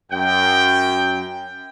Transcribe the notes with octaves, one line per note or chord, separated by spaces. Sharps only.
F#2 G5